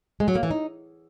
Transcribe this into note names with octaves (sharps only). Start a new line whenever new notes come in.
G#3
F#3
A#3
E3
D#4